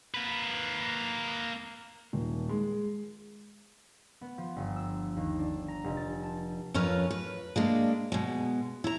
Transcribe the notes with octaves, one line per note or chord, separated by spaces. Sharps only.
A#3 B4
D#1
G#3
B3
F3
G1
E6
D#2
D4
A#5
F1
A6
A5
F2 C#4 F4 A#4 B4
B4
G#3 A#3 D4
B2 G#3
E4 A#5